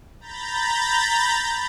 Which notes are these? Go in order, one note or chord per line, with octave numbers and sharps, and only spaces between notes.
A#5 B5 G6 A6